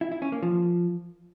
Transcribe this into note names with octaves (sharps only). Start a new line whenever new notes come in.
E4
E4
C#4
A#3
F3